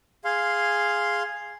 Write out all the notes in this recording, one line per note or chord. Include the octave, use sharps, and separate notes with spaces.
G#4 F5 C6